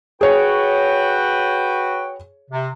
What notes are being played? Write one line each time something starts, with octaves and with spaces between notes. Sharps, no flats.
F#4 G#4 B4 C#5 G5
C3